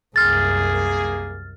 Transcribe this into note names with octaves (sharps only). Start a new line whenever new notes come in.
C2 F#2 A#3 G#4 F6 A6